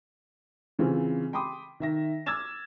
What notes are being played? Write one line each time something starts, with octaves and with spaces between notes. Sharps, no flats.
C#3 E3 C4 F4
G5 B5 C6 D6 D#6
D#3 E5 A#6
D6 E6 F6 G#6 A6 E7